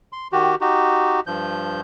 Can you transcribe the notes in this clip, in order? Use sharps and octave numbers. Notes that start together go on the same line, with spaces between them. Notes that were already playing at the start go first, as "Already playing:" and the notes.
C6
D#3 F#4 G4
D#4 F#4 G4
G2 F3 G6